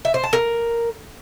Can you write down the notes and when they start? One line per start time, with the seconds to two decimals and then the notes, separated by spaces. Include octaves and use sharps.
0.05 E5
0.14 C5
0.23 A5
0.33 A#4